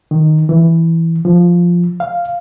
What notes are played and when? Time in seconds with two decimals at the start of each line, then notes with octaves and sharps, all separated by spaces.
0.11 D#3
0.49 E3
1.25 F3
2.00 F5